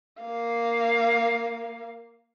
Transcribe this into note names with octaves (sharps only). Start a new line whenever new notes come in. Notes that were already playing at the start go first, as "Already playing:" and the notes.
A#3 F5